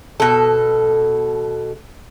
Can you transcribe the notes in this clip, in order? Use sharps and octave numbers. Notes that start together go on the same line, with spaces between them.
B2 A4